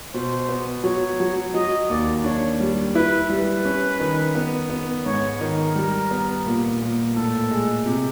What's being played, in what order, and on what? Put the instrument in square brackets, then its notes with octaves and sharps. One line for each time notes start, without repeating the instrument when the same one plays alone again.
[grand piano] B2 [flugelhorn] C5
[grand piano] B3
[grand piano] F#3 [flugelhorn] C#5
[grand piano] F#3
[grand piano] F#3 [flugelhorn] D#5
[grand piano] D#2 [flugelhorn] D5
[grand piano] D4 [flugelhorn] C#5
[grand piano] G3
[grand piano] E4 [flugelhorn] B4
[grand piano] G3 [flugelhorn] B4
[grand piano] C#4
D#3
B3
B3
[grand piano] G#2 [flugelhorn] C#5
[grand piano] D#3 [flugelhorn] A#4
[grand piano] G3
B3
A#2
A#2
[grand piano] A2 [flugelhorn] A4
[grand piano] G#3
C3